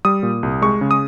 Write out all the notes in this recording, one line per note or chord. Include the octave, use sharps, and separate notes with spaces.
G3 D#6
A#2
C2
G#3 C#6
C#3
D#6